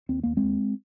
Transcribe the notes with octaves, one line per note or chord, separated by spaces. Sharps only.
D#2 C4
D#2 A#3
G#3 C4
D#2